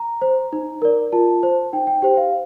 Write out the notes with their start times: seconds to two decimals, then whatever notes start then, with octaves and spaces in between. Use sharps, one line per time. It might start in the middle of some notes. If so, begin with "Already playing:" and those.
Already playing: A#5
0.21 C5
0.53 D#4
0.82 A#4 D5
1.12 F4 A5
1.43 C5
1.73 D#4 G5
1.87 G5
2.02 G4 C5 G5
2.17 F5